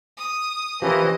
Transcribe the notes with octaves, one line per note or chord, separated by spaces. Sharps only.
D#6
E3 F3 C#4 G4 A#4 C5 D#5